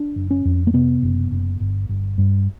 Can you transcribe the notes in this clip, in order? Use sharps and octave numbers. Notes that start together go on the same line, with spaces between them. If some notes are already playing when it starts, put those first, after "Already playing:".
Already playing: D4
F#1
C#4
F2
A#3
C3 B3
F#1
F#1
G1
G1
G2